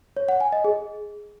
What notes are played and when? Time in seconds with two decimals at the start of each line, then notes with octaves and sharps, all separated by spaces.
0.17 C#5
0.29 F#5
0.40 G#5
0.52 D#5
0.64 G#4